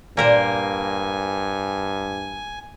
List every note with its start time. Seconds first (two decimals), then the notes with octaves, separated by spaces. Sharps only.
0.17 G2 A#2 A#3 G4 A#4 C5 D5 G#5